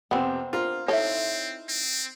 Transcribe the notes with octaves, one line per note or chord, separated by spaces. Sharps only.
F2 C3 B3 C4 G#5
D4 F4 A#4 C5
C4 D#4 E4 A4 C#5 E5
C4